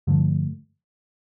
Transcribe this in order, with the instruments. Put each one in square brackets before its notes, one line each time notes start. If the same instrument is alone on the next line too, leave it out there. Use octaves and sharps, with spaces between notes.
[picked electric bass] G2 D3 F3 A3